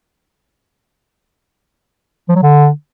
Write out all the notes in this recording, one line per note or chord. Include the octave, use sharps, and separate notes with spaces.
F3
F#3
D3